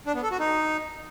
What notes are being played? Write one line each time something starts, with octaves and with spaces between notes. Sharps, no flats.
D4
B3
A4
F#4
D#4